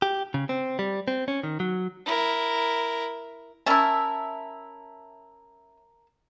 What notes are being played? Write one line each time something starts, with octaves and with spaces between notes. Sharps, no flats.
G4
C#3
C4
G3
C4
C#4
D#3
F#3
E4 A#4
C#4 E4 A#4 E5 A5